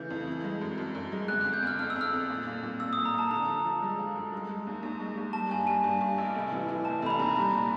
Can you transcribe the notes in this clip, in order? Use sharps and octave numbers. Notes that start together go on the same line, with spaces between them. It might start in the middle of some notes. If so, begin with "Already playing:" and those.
Already playing: C#3 E3 A3 G6
F2
E3
G#3
F#2
F#2
F#2
G#3
G1 F#6
F2 F#6
G6
G1 F6
F2 F6
E6
F2
F6
F2
A#2
A#2
A#2
A#2 E6
A#2 D#6
A#5
A#2 A5
D3 A#5
F3
F3
G#3
F3
F#2
G#3
G#3
D#2
D#2
G#3
D#2
G3 A5
G2 G#5
G3 G#5
G2
G2
A1
F1
E3
E3
F1 A5
F1 B5
A#5
D#2
G3 B5
A#2